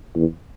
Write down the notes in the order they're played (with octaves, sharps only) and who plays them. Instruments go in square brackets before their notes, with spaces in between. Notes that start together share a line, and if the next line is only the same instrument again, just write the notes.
[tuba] E2